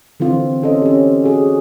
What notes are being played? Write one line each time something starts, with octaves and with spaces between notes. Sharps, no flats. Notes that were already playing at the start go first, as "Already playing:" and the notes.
D3 E3 C4 F4
C#4 A4 C5 D#5
C#4 G4
F#4 G#4